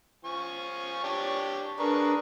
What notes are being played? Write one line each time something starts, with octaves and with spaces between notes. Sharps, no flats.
F3 G#5 C#6
D4 G4 C#5
D4 G#4 A#4 B4 C#6